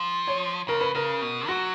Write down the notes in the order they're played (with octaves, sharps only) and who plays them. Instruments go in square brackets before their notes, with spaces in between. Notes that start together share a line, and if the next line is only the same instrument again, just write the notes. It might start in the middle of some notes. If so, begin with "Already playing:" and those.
Already playing: [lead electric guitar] F3
[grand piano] C#5
[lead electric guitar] C#3 [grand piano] A#4
[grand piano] B4
[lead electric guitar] C#3 [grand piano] A#4
[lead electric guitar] B2
[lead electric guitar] F#3 [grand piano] F#4